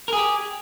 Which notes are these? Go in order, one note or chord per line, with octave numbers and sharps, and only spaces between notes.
G4 G#4 A#4